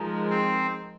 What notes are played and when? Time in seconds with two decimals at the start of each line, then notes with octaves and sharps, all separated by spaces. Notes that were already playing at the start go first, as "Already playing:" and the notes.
Already playing: F3 G#3 D#4 A#4
0.30 C4